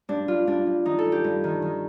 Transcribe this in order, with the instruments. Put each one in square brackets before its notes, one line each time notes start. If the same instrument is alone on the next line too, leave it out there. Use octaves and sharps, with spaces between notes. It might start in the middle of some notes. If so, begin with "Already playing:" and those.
[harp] G2 D4
G2 F4
G2 D4
G2
D#3 D#4
A4
G2
G4
G2
D#3
D#3